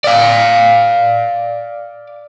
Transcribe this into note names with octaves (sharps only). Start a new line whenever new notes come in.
D5 F5